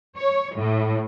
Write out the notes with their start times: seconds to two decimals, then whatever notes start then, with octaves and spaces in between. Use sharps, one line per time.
0.18 C#5
0.56 A2